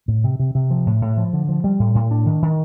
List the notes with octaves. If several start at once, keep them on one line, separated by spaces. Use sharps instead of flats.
A2
C3
C3
C3
F3
A2
A2
F3
D3
F3
G3
A2
A2
D4
D#3
D#3